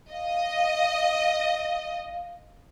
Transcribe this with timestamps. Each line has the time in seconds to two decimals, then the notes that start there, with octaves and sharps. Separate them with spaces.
0.12 D#5 F5